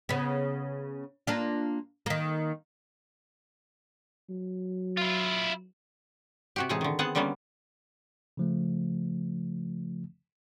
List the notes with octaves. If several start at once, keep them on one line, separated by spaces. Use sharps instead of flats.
C#3 B3
A#3 D4 F4
D#3 A#3
F#3
E4 F4
C3 F#4 G4
A2 C3 E3 G#3 D#4 G#4
D3 D#3
B3 C4 G#4 F#5 A5
D3 G3 A#3 B3 C#4
C#3 F3 A3